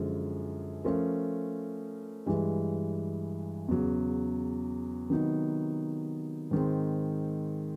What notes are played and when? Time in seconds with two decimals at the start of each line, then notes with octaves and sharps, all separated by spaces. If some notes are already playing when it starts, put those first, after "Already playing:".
Already playing: F#2 D3 F3 G#3
0.84 F3 A3 C#4 F4 A#4
2.26 G2 E3 G#3
3.68 E2 C#3 F#3
5.10 C3 D#3 F#3 B3 D#4
6.51 G#2 D#3 G#3 C4